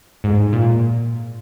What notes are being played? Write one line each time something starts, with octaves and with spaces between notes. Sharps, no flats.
G#2
A#2